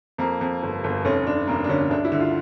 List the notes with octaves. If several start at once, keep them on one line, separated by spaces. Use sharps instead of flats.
F2 A#3
F2
G1
G1
F1 C#4
F1 D4
F1 A#3
D4
D3 C#4
D2 D4
E4
D3
F4